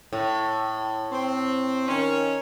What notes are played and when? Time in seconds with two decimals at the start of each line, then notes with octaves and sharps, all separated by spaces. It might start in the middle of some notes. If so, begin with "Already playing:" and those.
0.13 A2
1.12 C4
1.88 D#3 C#4